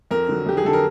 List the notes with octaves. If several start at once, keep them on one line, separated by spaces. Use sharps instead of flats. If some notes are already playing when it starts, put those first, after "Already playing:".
F2 A#4
D3 F#3
F2 G4
G#4
D3 F#3 A4
A#4